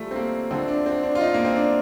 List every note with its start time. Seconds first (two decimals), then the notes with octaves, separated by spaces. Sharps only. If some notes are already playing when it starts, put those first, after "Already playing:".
Already playing: A1 A2 F3 G3 A3
0.11 C4
0.16 A#3
0.50 D2 D3 F3 C4
0.68 D4
0.86 C4
1.03 D4
1.15 F4
1.21 D#4
1.34 A#3
1.45 C4
1.56 D4